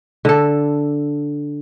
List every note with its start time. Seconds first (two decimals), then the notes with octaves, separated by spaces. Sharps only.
0.25 D3 A4